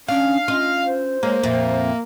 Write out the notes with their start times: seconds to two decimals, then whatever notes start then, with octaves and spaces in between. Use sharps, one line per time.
0.08 C#4 D4 F5
0.48 C#4 F4 D#5
0.85 C5
1.23 G#3 A#3 C#5
1.43 F2 A#2 E5